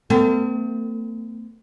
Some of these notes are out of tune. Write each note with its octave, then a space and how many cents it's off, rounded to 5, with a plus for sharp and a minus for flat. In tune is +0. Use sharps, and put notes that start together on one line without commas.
A3 +40 C4 -45